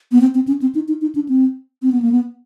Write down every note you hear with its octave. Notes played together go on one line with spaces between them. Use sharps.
B3
C4
C4
C#4
C4
D#4
D#4
D#4
D4
C4
C4
B3
A#3
B3